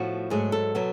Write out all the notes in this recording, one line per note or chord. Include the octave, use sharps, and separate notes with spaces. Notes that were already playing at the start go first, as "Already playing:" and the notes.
Already playing: A2 F3 B3 F#4
G#2 F#3 A3 G#4
A4
B2 F#3 B3